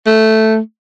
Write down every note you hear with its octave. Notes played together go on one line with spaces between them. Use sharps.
A3